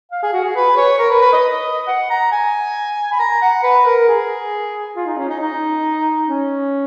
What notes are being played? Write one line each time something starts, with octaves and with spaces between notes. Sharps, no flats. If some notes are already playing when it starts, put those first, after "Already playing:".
F5
G#4
F#4
G#4
B4
C#5
A#4
B4
B4
D#5
F#5
A#5
G#5
B5
A#5
F#5
B4
A#4
G#4
F4
D#4
C#4
D#4
D#4
C#4